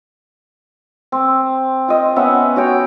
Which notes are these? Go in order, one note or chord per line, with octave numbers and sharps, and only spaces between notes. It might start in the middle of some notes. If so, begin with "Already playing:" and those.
C4
F4 D#5
B3 C#4 E5 F#5
F#4 C#5 G5